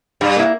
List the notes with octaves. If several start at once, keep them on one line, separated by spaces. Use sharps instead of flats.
G2 G3
A#3 E4